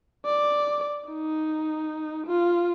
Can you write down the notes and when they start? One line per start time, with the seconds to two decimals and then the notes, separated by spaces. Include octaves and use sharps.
0.26 D5
1.08 D#4
2.27 F4